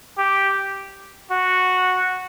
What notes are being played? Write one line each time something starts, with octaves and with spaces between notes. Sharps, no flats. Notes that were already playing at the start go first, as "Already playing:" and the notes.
G4
F#4